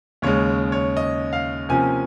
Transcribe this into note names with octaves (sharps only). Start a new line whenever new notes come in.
D#2 C#3 G#3 C#5
C#5
D#5
F5
C3 F3 A#3 C#4 G#5